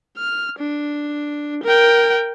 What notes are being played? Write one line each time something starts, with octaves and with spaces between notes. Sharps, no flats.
F6
D4
A#4 G5